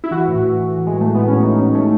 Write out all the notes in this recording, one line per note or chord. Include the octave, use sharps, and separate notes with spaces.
E4
E3 F#4
A2
E3
E3
E3
G#3
A2
A3
A2
B3
A2 C#4
A2 D#4
A2 C#4
A2 A3